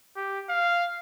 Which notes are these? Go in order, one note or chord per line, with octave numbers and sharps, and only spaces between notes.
G4
F5